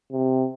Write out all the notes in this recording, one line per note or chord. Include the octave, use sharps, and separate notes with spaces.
C3